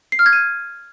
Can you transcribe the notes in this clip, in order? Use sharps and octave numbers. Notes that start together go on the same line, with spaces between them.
C7
F6
G#6
D#7